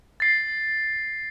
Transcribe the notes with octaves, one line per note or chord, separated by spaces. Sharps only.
A6 C7